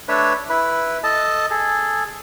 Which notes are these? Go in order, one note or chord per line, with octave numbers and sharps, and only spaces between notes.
A3 D4 B4 C#5
E4 B4
A4 D#5 A5
G#4 A4